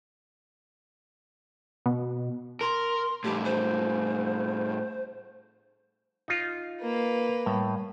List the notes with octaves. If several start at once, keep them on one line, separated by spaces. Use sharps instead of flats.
B2
A#4 C6
A2 G3 G4
C5
D#4 F4
A#3 B4
A2 G3